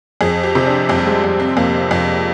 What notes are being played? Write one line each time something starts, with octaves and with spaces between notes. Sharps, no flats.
F2 G#4
G4
C3
D4
F2 C4
G3
G#3
F2
C4
F2 A#3
F2